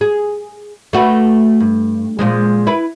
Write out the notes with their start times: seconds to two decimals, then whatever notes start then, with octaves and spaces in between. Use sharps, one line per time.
0.01 G#4
0.93 A3 F#4 B4
1.60 G2
2.19 A#2 F3 G#3
2.67 E4 B4